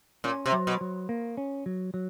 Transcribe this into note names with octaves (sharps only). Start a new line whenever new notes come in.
A#2 C#4
C3
F#3
B2
F#3
A#3
C#4
F#3
F#3